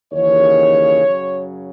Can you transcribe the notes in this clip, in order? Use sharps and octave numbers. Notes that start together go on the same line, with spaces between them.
D#2 C#3 E3 C#5
F#2 C#3 F#3